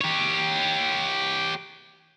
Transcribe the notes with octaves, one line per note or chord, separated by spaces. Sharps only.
G4 C#5